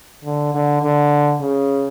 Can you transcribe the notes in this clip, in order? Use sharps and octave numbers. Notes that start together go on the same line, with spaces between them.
D3
D3
D3
C#3